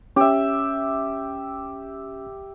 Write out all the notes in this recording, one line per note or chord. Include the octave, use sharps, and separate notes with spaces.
C#4 G4 E5